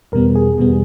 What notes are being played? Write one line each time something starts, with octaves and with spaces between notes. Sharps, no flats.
E2 B2 G3 B3 A#4
G#4
E2 B2 G3 B3